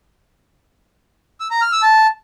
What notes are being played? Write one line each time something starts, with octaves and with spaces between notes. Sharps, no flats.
E6
A#5
F6
E6
A5